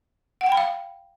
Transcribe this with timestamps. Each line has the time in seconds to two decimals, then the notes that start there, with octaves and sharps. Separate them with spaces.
0.41 F#5
0.46 G5
0.52 B5
0.57 F5